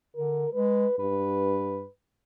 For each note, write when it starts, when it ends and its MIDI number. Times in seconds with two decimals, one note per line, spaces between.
0.16 0.46 50
0.16 0.53 70
0.53 0.86 56
0.53 0.98 71
0.99 1.84 43
0.99 1.88 71